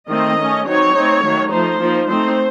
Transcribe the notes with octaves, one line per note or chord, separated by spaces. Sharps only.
D#3 A3 C4 D#5
A3 C#4
F#3 C4 D#4 C#5
A3 C4 D#4
D#3 F#3 A3
F3 A3 D#4 C5
F3 A#3 D#4
A3 C4 D#4 C5